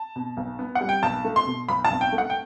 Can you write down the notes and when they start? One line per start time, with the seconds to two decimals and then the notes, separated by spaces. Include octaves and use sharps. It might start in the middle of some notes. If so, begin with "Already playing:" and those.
Already playing: A5
0.16 B2
0.37 B1
0.59 B3
0.75 F#5
0.81 G3
0.89 G5
1.03 B1 A5
1.25 A3
1.36 C6
1.47 B2
1.68 B1 B5
1.85 A5
1.90 B1
2.01 G5
2.12 A3
2.18 F#5
2.30 G5